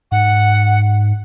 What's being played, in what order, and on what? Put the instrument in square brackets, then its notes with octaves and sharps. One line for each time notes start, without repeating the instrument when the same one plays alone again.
[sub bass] G#2 [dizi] F#5